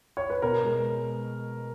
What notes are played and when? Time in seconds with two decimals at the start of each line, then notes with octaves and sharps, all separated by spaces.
0.17 C#5
0.30 B4
0.42 B2 A#4
0.63 G#3